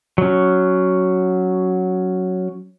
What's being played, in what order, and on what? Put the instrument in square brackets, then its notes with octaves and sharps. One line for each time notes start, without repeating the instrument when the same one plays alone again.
[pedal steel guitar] F#3 C#4